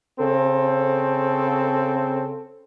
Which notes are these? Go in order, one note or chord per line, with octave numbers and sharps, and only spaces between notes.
C#3 C4 A4